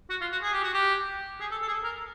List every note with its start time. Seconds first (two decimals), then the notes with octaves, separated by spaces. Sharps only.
0.10 F#4
0.21 F4
0.32 F#4
0.42 G#4
0.53 G4
0.64 F#4
0.74 G4
1.40 G#4
1.51 A4
1.62 A4
1.68 G#4
1.73 A4
1.84 A#4